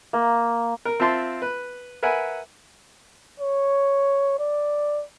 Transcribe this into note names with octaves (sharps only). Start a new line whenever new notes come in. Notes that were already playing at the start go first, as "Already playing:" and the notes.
A#3
A#4
C4 F4 E5 A5 C6
B4
A#4 B4 E5 F#5 G#5
C#5
D5